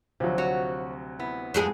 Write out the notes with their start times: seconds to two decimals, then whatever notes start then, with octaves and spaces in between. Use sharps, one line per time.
0.20 D2 C3 F3 F#3
0.38 F#4 C#5
1.20 B3 E4
1.54 F2 G#3 G#4